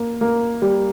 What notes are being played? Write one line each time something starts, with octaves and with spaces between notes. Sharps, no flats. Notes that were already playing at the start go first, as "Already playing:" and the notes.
Already playing: A#3
A#3
G3